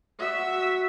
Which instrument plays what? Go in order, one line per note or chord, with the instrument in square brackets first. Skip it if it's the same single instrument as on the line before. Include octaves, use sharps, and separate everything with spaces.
[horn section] F#4 [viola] E5